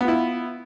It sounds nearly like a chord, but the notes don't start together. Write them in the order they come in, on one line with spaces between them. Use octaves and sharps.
B3 F4 E4